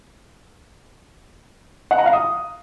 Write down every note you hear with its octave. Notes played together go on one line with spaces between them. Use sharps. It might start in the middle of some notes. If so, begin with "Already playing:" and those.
F#5
A#5
F5
D#6